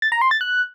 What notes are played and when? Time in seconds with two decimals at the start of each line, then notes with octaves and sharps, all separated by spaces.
0.02 A6
0.12 A#5
0.22 C6
0.31 A6
0.41 F#6